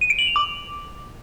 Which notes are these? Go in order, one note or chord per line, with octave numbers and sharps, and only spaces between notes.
D#7
D7
F#7
F7
D6